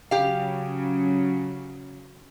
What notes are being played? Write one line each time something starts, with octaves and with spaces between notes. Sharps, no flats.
C#3 F#3 G4 F5